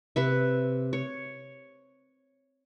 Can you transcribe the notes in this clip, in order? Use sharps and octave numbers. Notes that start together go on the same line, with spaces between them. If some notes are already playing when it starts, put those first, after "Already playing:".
C3 B4 E5
C#5